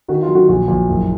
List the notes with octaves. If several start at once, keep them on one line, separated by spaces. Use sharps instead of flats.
D#3 F#4
F4
F#3
F#4
A#1 F#4
A#1
F#1